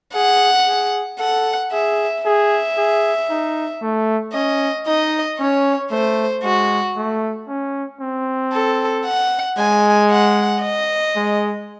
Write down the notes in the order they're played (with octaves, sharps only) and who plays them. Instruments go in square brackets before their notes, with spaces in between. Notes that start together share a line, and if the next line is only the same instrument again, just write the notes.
[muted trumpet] G#4 [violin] F#5
[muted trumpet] G#4
[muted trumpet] A4 [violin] F#5
[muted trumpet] G#4 [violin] E5
[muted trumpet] G#4 [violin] E5
[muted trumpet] G#4
D#4
A3
[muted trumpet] C#4 [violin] D#5
[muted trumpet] D#4 [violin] D#5
[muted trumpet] C#4 [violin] C#5
[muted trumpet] A3 [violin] C5
[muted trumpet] G#3 [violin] F#4
[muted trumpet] A3
C#4
C4
[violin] A4
F#5
[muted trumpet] G#3 [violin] G#5
[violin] F#5
D#5
[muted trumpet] G#3